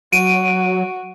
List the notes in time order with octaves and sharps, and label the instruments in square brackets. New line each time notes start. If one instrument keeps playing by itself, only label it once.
[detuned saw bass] F#3 [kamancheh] F#4 [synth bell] D7 D#7